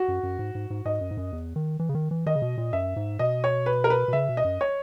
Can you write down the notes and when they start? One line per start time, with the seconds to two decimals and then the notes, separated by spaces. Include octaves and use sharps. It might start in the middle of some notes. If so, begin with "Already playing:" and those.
Already playing: F#4
0.08 F#2
0.23 F#2
0.39 G#2
0.55 G#2
0.70 G#2
0.85 G#2 D#5
1.01 F#2
1.11 G#2
1.17 F#2
1.32 E2
1.56 D#3
1.79 E3
1.89 C#3
1.95 D#3
2.11 E3
2.26 D#3 D#5
2.35 C#3
2.42 B2
2.57 A#2
2.73 F#2 E5
2.96 G#2
3.19 B2 D#5
3.44 C#5
3.66 B4
3.84 A#4
3.90 B4
4.08 B2
4.13 C#3 E5
4.29 B2
4.37 D#5
4.44 F#2
4.61 C#5